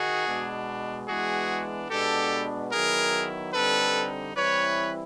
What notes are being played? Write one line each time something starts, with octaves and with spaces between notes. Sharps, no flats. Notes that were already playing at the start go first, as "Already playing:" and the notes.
Already playing: D#3 D#4 F#4 G#4
B2 G#3 B3 D4
E3 G#3 B3 D4 F#4 G#4
B2 G#3 B3 D4 G4 A4
D#3 F#3 B3 E4 G#4 A#4
D3 G3 C4 D#4 A4 B4
E3 G3 C4 E4 B4 C#5